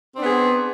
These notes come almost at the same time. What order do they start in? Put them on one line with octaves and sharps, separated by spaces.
C4 D4 B3 G#4